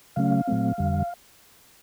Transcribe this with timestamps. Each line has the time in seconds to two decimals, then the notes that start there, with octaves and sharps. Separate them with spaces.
0.16 C#3 F#3 A3 C#4 F5
0.47 A#2 F#3 A3 C4
0.78 F2 D3 G3